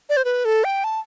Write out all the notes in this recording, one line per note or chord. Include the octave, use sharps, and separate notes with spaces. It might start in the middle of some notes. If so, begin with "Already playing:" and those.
D5
C5
B4
A4
G5
A5